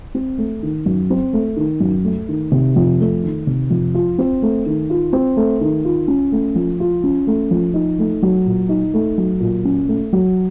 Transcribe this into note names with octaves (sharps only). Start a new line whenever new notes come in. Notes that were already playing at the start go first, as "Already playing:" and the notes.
C4
A3
D#3
F#2
C4
A3
D#3
F#2
A3
D#3
C3
F2
A3
D#3
C3
F2
F4
C4
A3
D#3
F4
C4
A3
D#3
F4
C#4
A3
F3
F4
C#4
A3
F3
D#4
A3
F#3
A#2
D#4
A3
F#3
A#2
C#4
A3
F#3